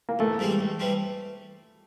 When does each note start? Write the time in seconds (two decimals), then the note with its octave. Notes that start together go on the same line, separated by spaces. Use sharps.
0.09 A#3
0.19 A1 A3
0.39 G#2 E3 G3 C4
0.59 A1
0.79 E3 G3 C4